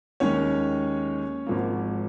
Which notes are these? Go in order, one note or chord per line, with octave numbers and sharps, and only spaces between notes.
D#2 D#3 G#3 C#4 C#5
G#1 G#2 F3 A#3